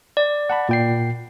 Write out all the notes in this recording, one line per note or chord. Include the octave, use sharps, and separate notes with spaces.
D5
F#5 A5 B5
A#2 G5 C7